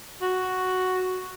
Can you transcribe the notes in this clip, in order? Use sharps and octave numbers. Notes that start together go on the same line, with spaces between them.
F#4